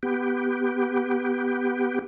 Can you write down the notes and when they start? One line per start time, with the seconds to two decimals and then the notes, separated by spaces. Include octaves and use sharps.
0.03 B3 G4